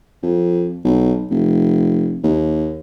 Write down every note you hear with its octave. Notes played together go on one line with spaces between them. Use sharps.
F2
B1
F1
D#2